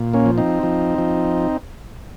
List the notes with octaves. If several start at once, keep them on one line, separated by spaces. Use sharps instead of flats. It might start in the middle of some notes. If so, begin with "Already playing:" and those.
Already playing: A#2
A#3 C#4
F3
C4 D#4
F3
F3